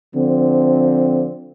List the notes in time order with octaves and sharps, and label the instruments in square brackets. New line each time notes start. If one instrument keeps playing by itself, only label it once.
[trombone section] D3 F3 C4